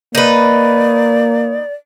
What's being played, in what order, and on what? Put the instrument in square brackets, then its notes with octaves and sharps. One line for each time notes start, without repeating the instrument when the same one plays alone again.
[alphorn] A#3 [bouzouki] D#4 B4 [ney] D5